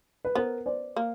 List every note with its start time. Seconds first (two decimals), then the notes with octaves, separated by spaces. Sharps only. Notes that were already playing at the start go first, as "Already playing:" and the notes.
0.25 B4
0.35 B3 A#4 C5
0.66 C5 D5
0.96 A#3